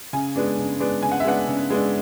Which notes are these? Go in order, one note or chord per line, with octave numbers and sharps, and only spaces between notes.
C#3 G#5
G#3 B3 D4
C#3
G#3 B3 D4
C#3 G#5
F#5
E5
G#3 B3 D4 F#5
C#3
G#3 B3 D4